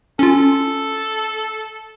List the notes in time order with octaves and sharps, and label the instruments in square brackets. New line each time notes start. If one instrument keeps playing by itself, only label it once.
[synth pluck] C#4 F4 [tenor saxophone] A4